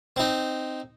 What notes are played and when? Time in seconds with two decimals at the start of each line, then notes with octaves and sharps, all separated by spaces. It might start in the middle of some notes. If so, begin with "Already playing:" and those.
0.16 C4 D#4